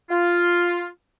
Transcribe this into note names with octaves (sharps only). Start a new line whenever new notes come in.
F4